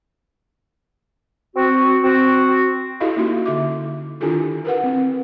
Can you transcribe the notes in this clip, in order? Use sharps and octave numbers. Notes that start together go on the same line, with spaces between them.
C4 F#4
C4 F#4
E4 F#4 G4 A4 D#5 F5
A#3 C#4 D#4 F#4 C6
D3 E5 D6
D#3 D4 E4 F4 G4 A4
A#4 B4 F#5
C4